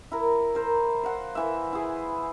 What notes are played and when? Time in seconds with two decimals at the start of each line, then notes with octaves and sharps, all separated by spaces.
0.12 E4 A#4
0.55 A#4 C5
1.03 C5 F5 F#5
1.35 E3 E5
1.73 E4 G#4